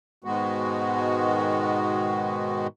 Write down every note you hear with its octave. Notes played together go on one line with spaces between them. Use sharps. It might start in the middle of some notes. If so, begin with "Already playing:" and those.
G#2 B2 D#3 G#3 B3 F#4